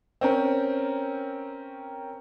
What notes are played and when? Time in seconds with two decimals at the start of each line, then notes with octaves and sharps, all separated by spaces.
0.21 C4 C#4 A#4